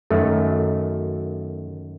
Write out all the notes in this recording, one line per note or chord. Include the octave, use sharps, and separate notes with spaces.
F#2 D#3 F#3 A3